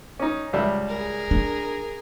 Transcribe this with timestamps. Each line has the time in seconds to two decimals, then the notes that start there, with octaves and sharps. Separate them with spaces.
0.19 C#4 D#4
0.53 C#2 G3 E5
0.88 G#4 A#4
1.31 D4